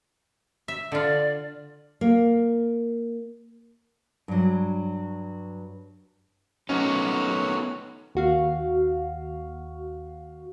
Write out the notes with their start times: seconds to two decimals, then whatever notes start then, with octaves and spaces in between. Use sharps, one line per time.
0.68 E5
0.92 D3 F4 D5
2.01 A#3
4.28 G2 F#3
6.69 F#3 A3 B3 C#4 D#4 F#4
8.15 D#2 F#4 F5